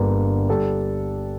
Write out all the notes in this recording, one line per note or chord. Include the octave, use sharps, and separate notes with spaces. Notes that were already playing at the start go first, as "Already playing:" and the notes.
Already playing: G1 G2 D3 G3 A#3
D3 G3 D4 A4